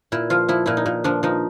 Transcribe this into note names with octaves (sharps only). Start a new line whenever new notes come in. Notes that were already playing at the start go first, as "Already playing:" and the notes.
A#2 E4
F3 F4
F3 E4
A#2 E4
D#4
A#2
F3 D4
F3 D#4